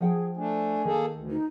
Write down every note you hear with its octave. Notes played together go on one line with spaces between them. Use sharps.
F3 G#4 F#5 G5
A3 D4 G#5
D#3 A#3 G#4 A4
D2
D#4